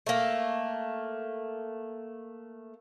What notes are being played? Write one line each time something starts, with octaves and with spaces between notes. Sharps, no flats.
A3 A#3